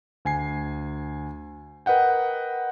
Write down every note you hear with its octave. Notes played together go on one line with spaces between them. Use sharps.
D2 G#5 C7
A#4 B4 D#5 F#5 G5